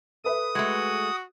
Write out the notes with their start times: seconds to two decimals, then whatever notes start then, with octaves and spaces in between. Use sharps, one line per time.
0.24 A4 B4 E5 D#6
0.55 G#3 A3 F#4